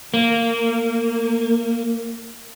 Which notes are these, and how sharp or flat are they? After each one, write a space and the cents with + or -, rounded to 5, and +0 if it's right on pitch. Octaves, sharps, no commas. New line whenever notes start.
A#3 -20